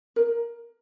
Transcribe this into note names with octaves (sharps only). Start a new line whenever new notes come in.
A#4